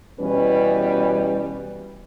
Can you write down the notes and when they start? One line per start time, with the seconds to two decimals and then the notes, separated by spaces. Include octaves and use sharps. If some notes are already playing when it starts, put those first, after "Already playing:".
0.20 B2 E3 G3 C#4 B4